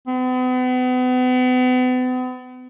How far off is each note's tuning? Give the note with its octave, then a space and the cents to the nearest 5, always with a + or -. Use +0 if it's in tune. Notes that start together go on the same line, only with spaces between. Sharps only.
B3 +40